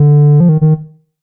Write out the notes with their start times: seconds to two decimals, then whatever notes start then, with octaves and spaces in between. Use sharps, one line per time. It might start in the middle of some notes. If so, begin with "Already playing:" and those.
Already playing: D3
0.40 F3
0.49 D#3
0.61 D#3